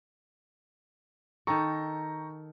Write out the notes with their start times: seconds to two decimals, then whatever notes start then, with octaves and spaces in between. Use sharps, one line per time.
1.47 D#3 A4 G5 A#5 C#6